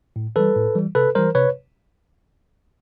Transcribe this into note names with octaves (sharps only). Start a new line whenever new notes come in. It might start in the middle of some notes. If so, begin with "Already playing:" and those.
A2
E3 G3 A4 B4
A2
E3 G3
C3 A4 B4
E3 G3 A#4 C5
C3 B4 C#5